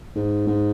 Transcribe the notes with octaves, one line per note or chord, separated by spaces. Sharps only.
G#2
G#2